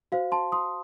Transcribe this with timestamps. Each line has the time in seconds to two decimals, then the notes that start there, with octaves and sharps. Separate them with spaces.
0.12 F#4 C5 F5
0.32 A5 C6
0.52 C6 D#6